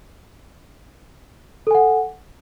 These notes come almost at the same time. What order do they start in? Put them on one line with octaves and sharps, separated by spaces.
A4 G#5 F#5